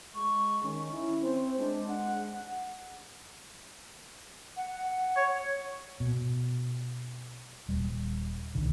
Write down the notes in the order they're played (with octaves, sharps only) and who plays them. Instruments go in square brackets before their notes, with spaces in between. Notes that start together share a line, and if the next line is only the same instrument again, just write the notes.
[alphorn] G#3 [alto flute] C#6
[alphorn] D#3 [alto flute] C#4
[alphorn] E4
[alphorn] C4 [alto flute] C5
[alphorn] G#3 [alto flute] D4
[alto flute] F#5
[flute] F#5
[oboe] C#5
[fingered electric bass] B2
D#1 G3
D1 C2 D3 D#3